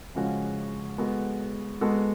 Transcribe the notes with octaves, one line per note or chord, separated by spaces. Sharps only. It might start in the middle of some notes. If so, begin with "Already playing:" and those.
C#3 F3 G#3 C#4 F#4
G#3 B3 F#4 A4
G#3 B3 F#4 A4